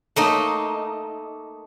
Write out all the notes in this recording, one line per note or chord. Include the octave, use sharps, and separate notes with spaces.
A3 A#3 D#4